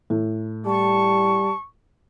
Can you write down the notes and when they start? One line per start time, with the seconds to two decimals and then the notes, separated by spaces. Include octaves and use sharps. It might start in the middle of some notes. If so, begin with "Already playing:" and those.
0.10 A2
0.66 G3 A5 C#6